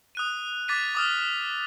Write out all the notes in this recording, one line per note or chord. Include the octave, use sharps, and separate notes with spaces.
D#6 F#6 D#7
D6 A6 B6 D#7
D6 D#6 F6